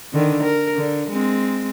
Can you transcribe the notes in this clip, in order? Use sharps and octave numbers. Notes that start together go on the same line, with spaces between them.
D3 D#3
A#4
D3
G#3 C4